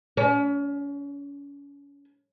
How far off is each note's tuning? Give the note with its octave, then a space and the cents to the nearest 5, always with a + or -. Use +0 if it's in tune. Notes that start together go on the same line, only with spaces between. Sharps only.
C#4 +35